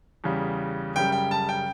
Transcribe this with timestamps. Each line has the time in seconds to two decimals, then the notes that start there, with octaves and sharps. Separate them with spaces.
0.24 E2 C#3 G3
0.96 F#2 C#3 G3 G5
1.12 G5
1.31 A5
1.49 G5